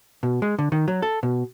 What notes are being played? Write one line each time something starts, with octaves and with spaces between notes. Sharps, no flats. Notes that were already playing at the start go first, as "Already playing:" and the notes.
B2
G#3
D3
D#3
F#3
A4
B2